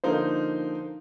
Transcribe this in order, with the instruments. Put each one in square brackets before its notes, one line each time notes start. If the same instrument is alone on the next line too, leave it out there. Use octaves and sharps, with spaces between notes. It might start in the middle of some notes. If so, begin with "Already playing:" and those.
[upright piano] D3 F3 A#3 D#4 C5